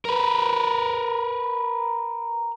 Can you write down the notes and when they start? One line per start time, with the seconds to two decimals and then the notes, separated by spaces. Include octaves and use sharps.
0.05 A#4 B4